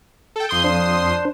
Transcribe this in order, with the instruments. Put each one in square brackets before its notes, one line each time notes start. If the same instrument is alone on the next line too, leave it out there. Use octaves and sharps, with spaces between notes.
[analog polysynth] A4 G5
[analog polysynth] F2 C6 D#6 [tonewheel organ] G6
[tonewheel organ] D4 C5